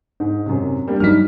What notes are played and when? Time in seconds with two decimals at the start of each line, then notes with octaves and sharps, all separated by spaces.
0.20 G#2
0.46 F#2 C3
0.88 G3 A#3 D4
1.00 G2 F#3 D#4 F6 B6